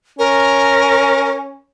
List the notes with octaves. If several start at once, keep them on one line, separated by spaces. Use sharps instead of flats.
C#4 A#4